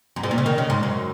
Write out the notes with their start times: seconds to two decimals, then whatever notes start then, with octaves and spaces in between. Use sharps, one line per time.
0.16 F#2
0.23 G#2
0.31 A#2
0.38 C#3
0.46 D#3
0.58 C#3
0.70 G#2
0.83 F#2